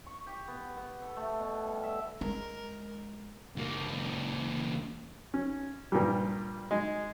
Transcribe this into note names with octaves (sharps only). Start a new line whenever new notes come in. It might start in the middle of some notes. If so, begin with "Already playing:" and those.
C#6
G4
B3
B3
A4
A3
B2
G3
E5
G#3 A#4
C#2 A#3
C#4
G2 A#2 F3 G3
G#3